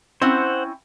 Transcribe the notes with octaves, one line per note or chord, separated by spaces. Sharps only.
C4 C#4 E4 C5 F#5